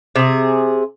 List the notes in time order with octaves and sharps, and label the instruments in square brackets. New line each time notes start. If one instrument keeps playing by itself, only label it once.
[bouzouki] C3 G#4